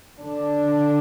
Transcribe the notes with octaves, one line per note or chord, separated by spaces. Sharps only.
D3 D4